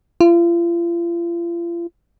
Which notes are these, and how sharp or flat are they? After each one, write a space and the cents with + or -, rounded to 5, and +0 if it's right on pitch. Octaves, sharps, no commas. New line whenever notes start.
F4 -40